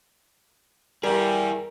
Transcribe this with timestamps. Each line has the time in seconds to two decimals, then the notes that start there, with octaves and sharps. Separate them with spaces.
1.03 G3 E4 G#4 A#4